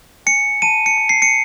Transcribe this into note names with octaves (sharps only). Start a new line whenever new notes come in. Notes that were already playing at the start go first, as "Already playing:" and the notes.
G#5 C#7
A5 D#7
C#7
A5
C7
C#7